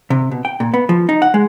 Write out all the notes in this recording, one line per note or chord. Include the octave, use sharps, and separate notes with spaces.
C3
B2
G5
A#2
B3
F3
D#4
F#5
G#3